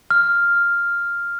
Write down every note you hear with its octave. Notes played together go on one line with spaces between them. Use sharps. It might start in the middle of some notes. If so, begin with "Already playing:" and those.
F6